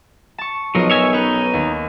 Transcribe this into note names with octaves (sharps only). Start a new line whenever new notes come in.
A5 C#6
B1 F3 F#3 A#4 D#5
C#5 E5 G#5
C#4 D#4 B4
D#2